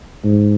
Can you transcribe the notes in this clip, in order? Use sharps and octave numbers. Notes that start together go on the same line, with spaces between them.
G#2